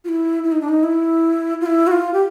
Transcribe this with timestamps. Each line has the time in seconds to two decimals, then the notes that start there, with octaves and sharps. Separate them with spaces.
0.05 F4
0.09 E4
0.43 E4
0.52 D#4
0.61 D4
0.69 D#4
0.83 E4
1.61 F4
1.66 E4
1.87 F#4
1.92 F4
2.13 G4